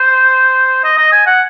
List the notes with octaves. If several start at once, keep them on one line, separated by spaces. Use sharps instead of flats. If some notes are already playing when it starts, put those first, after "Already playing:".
Already playing: C5
D#5
D#5
G#5
F#5